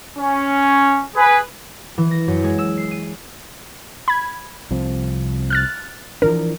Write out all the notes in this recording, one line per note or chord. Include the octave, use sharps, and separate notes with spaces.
C#4
G#4 B4
E3
A#6
F#2
G#3
E6
C7
D#7
B5 G#6
C2 F3 C4
F6 F#6 A6
E3 F3 D4 A#4